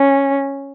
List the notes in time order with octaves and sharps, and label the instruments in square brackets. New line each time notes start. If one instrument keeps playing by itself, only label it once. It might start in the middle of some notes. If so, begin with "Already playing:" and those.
Already playing: [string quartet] C#4